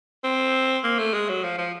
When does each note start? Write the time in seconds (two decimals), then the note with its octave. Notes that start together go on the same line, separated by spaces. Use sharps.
0.24 C4
0.84 A#3
0.99 A3
1.14 G#3
1.29 F#3
1.44 F3
1.58 F3